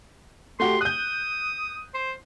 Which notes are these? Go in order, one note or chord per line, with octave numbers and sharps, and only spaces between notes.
A3 F#4 G4 C6
D#6 F#6 G6
C5